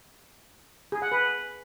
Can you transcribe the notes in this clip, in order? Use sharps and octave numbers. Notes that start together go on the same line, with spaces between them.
G#4
F#5
B4